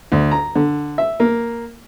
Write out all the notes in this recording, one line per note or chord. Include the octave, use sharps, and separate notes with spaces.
D2
A#5
D3
E5
A#3